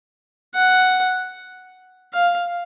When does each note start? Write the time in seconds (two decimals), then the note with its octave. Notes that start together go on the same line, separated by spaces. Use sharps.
0.55 F#5
2.14 F5